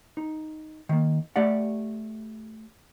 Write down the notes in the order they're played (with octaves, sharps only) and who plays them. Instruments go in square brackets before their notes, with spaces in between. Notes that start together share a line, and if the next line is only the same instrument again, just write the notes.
[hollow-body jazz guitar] D#4
D#3 A#3
A3 G4 D5 F#5